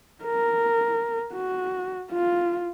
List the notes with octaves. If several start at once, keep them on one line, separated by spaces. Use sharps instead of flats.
A#4
F#4
F4